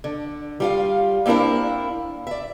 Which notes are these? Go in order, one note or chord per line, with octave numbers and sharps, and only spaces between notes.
D3
G3 F4 F5
A#3 C4 D4 E4 A#4
D5 E5